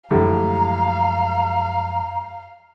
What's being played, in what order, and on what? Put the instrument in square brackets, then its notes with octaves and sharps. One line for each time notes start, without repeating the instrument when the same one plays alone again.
[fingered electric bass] F#2 F3 G#3 [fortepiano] A2 D3 G3 [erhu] F5 [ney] A#5